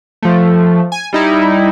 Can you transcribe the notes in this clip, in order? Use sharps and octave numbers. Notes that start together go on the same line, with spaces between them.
F3 A3
G#5
G3 D#4 E4